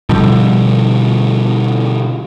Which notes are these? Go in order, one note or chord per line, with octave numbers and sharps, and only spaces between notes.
B2 D3 F3 G3